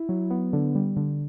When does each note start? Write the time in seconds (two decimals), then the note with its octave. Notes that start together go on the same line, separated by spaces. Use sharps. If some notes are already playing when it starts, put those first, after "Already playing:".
Already playing: E4
0.09 F#3
0.30 B3
0.53 D3
0.75 G3
0.96 D3